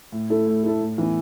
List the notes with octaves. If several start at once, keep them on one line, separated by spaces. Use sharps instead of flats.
A2
A3 E4 A4
A2
A3 E4 A4
A2
E3 B3 E4